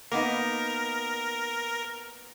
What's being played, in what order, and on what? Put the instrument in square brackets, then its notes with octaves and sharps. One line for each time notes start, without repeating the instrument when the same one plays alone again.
[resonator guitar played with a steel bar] A#3 B3 D#4 [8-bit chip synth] A#4